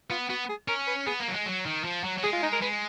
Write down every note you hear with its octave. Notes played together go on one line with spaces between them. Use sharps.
B3 F4
B3 F#4
G#4
C#4 A#4
B4
B3 G#4
A#3
F#3
G#3
F#3
D#3
F3
F#3
F#3
G#3 G#4
F4
D#4
A#4
G#3 B4